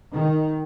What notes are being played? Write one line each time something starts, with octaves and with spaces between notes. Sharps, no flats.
D#3